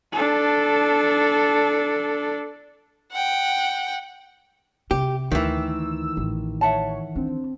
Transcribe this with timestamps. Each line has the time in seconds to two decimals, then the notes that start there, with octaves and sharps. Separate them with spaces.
0.12 D4 A4
3.12 F#5 G5
4.91 C3 G4
5.32 D2 D#3 E3 E6
6.17 A1
6.61 C#5 E5 F#5 A5
7.16 C4 D4